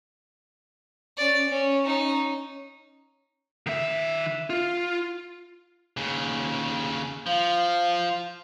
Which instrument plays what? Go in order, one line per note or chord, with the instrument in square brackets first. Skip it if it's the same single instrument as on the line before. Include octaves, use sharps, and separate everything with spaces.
[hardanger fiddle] C#4 D5
C#4
C#4 D#4
[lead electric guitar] D#3 E5
F4
[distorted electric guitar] D#2 C#3
[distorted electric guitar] F3 [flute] F5